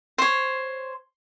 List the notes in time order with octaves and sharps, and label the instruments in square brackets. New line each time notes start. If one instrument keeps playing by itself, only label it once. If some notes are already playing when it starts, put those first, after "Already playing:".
[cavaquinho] C5 C#5